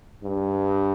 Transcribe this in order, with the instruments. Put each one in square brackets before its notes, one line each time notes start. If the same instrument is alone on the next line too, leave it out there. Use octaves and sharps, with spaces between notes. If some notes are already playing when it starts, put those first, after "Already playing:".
[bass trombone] G2